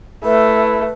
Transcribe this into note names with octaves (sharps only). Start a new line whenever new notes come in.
A3 E4 B4